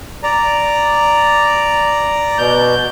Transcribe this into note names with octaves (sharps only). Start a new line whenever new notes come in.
D5 A#5
B2 G6